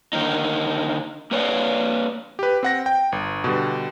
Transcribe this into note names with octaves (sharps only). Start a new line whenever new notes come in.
D3 D#3 A#3 D#4
A#3 B4 C#5 D5 F5
G4 B4
C4 F#5 A#6
G5
G1
B2 D3 G3